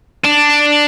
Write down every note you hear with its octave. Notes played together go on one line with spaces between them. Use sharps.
D4